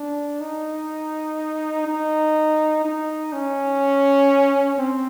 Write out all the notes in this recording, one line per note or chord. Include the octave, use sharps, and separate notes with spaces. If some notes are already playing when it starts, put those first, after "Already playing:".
Already playing: D4
D#4
D#4
D#4
C#4
C4